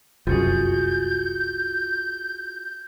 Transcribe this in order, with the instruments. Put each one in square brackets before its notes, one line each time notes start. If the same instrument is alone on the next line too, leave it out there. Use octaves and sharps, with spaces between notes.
[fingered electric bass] F1 C2 F#2 [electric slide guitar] F4 F#4 G#4 [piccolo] G6